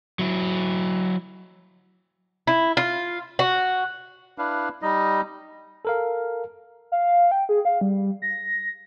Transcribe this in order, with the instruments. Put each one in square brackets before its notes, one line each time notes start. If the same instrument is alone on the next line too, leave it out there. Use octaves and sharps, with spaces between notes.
[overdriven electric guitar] F#3 E4
[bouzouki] E4
F4
F#4
[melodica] D4 E4 B4 F5
G3 D#4 D#5
[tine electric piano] A4 A#4 F5
[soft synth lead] F5
G5
G#4
F5
G3
A#6